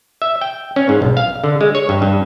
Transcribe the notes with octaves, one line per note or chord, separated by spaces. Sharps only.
E5
G5
C#4
G#2
B1
F5
D3
G#3
C#5
G2
G2